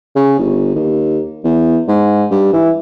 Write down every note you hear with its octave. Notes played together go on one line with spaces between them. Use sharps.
C#3
G1
D#2
E2
G#2
G2
E3